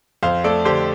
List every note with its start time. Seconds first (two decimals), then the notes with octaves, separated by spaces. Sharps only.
0.23 F2 C5 F5
0.44 A3 A4 D5
0.65 D3 G4 C5